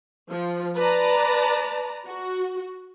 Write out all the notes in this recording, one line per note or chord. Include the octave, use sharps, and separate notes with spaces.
F3
B4 D5 A5 A#5
F#4